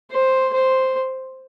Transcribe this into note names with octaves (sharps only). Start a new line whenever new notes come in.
C5
C5